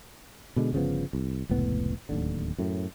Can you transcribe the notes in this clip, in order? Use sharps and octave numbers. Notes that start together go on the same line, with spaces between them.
B2 D3 G#3
G1 C#3 F3 B3
C2
F1 C#2 A2 B3
D1 D#2 D3
F#2 A2